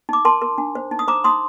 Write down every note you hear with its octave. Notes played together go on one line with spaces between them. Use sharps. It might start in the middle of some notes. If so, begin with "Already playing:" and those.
D#4 D6
A#4 A5 C6
A#4
D4
C5
D#4
D#6
C5 A#5 D6
D#4 C6 D#6